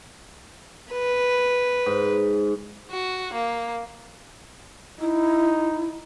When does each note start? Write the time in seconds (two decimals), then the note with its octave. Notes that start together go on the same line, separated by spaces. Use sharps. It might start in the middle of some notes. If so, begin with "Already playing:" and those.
0.92 B4
1.86 G#2
2.91 F#4
3.33 A#3
5.00 D#4 E4